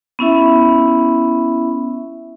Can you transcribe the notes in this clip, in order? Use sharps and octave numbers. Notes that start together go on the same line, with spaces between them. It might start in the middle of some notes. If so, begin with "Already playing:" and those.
B3 C#4 E4 E5